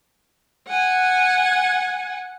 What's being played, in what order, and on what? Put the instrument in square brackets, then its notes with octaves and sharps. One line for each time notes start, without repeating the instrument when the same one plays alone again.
[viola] F#5 G#5